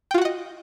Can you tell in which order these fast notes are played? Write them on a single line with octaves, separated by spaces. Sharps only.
G5 F4 F#4 F#5 D#5